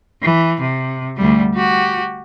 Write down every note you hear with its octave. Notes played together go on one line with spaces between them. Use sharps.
E3
C3
D2 G3
F#4 G4